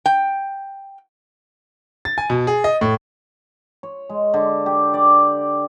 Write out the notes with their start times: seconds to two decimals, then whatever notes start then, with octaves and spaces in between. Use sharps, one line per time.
0.06 G5
2.05 A6
2.18 G#5
2.30 B2
2.47 G#4
2.64 D#5
2.81 A2
3.83 C#5
4.09 G#3
4.34 D3
4.66 G4
4.94 D5